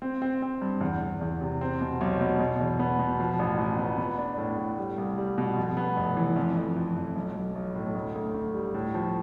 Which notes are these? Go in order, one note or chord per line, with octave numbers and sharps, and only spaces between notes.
C4
C4
C4
G2
E2
E2
E2
C3
C4
B2
B1
B2
B2
E2
B3
B2
F3
A1
A1
B3
B3
D4
A2
A2
G3
C2
G3
B2
F2
B3
F1
E3
F2
F2
F2
F2
B1
B1
B1
A2
D2
D2
D2
G3
A2
F3